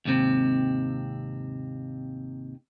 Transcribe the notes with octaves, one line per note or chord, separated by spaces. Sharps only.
D#2 G#2 C3 C4